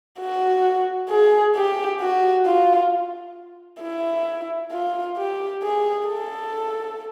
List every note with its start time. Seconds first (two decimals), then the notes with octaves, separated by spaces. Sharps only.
0.19 F#4
1.09 G#4
1.55 G4
2.00 F#4
2.46 F4
3.81 E4
4.72 F4
5.18 G4
5.63 G#4
6.08 A4